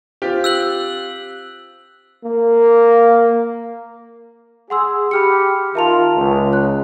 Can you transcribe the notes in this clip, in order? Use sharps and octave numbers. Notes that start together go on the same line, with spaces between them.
C4 F4 G4
E6 F#6 F#7
A#3
G#4 F#5 C6 E6
G4 B5 F6 C#7
D#3 F4 A#4 E5 A5 F7
C#2
C#5 F#6